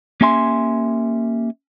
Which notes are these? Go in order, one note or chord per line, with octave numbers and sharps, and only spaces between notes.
A#3 C#4 G4 E5 G#5 C6